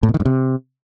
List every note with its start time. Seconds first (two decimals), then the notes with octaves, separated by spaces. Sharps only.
0.03 A2
0.09 B2
0.14 D#3
0.20 G2
0.25 C3